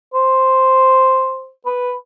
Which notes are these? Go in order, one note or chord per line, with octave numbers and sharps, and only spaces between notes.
C5
B4